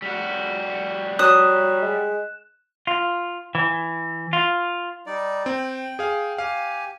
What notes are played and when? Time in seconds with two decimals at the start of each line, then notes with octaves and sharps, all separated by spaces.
0.02 G3 F#4
1.19 F#3 D#6 F#6 E7
1.82 G#3
2.87 F4
3.55 E3
4.33 F4
5.06 G3 D#4 D5
5.46 C4 G5
5.99 G#4 F5
6.38 G4 F5 G#5